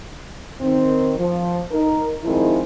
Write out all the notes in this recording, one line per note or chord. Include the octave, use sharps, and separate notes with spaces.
D#3 C4
F3
D#4 A#4
D#3 F3 G#3 C4 E4